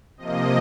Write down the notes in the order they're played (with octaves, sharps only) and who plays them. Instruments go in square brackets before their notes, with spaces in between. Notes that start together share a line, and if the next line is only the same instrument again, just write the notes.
[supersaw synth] C3 F3 A#3 D#5